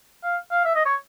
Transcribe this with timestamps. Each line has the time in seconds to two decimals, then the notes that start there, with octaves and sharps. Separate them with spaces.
0.23 F5
0.51 F5
0.65 E5
0.75 D#5
0.85 C#5